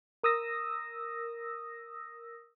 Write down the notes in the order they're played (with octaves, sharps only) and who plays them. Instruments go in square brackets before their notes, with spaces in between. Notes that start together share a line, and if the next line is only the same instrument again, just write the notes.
[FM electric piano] A#4 D#6 E6 A#6